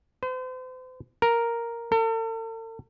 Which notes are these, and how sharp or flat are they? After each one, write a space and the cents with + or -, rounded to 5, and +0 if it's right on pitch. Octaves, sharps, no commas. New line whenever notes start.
C5 -40
A#4 +0
A4 +45